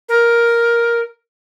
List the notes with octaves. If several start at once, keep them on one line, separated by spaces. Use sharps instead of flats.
A#4